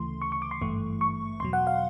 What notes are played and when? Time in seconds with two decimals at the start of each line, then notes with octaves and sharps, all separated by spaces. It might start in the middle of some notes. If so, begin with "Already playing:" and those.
Already playing: D2 C#3 E3 A3 C6
0.22 C#6
0.32 C#6
0.42 D6
0.51 C6
0.61 G#1 G2 E3 A3 C#6
1.01 C#6
1.40 E2 B2 F#3 C6
1.53 F#5
1.67 F5